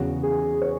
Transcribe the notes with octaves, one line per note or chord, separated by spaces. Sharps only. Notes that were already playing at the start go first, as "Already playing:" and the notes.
Already playing: E2 C#3 F#3 F#4
G#4
C#5